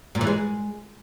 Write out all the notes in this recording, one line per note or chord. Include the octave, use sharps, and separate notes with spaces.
A#2
E3
G#3